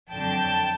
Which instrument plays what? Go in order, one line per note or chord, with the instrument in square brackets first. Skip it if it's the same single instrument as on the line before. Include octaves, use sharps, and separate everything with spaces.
[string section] F2 D3 F#3 G5 A5